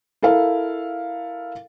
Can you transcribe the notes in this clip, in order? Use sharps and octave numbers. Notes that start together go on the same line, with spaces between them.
E4 A4 A#4 F5